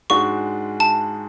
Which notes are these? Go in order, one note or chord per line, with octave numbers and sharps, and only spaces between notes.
G#2 G#3 D4 F#4 C#6
A5